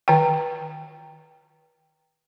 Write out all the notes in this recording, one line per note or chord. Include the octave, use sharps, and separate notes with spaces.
D#3 G5